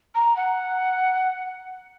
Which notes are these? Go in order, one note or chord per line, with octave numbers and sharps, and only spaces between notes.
A#5
F#5